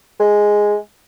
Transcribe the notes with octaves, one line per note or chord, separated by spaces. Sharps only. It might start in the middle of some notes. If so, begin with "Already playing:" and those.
G#3